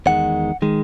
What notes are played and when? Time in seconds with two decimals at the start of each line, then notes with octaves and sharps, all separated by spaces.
0.06 E2 D#3 G#3 F#5
0.62 D#3 G#3